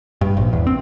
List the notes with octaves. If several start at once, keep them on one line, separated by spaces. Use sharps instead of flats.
G2
A#1
E2
C4